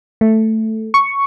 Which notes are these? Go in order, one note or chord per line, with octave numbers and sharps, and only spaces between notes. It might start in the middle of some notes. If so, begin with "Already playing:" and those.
A3
C#6